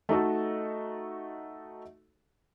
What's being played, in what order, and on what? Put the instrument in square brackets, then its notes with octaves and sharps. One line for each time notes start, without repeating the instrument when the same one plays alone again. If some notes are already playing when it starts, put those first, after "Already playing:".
[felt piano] A3 D#4 F#4 A4